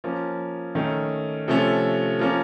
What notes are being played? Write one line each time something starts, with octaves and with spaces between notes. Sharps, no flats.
F3 A#3 C#4
D#3 A3 C#4
C3 F3 A3 C#4
F3 A#3 C#4